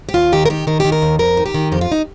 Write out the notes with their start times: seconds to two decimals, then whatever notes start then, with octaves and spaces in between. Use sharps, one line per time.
0.09 G4
0.14 D#2 F4
0.32 D#3 G4
0.45 A#4
0.50 D#3 G4
0.67 D#3 A#4
0.80 D#3 G4
0.92 A#4
1.02 D#2
1.19 F2 A#4
1.37 D#3
1.46 G4
1.54 D#3
1.72 F2 G4
1.81 F4
1.92 D#4